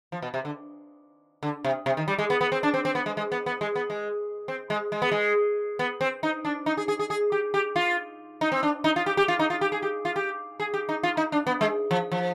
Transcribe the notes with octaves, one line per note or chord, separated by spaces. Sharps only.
F3
B2
C3
D3
D3
C3
C3
D#3
G3
G#3
B3
B3
C4
D4
C4
C4
B3
G#3
G#3
B3
B3
G#3
B3
G#3
C4
G#3
G#3
B3
G#3
B3
C4
D#4
D4
D#4
G#4
G#4
G#4
G#4
G4
G4
F4
D#4
C4
D4
D#4
F4
G4
G4
F4
D#4
F4
G4
G#4
G4
F4
G4
G#4
G4
D#4
F4
D#4
D4
B3
G#3
F3
F3